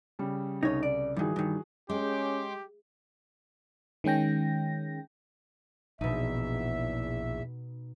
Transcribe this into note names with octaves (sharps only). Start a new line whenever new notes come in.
C#3 G3
C2 C#3 D#4 C#5
D5
G2 D#3 E3 F#4 G#4
G2 D#3
G#3 C#4 G4 G5 C6 D6
D#3 G#3 C#4 G5 A#6
A#1 E2 B2 D#4 E5